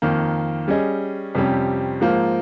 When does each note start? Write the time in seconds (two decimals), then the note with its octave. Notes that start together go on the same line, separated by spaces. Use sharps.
0.02 F2 D#3 A#3
0.68 G3 C#4 G#4 D#5
1.35 F2 C3 G3 C#4 G4
2.01 G#2 F3 A#3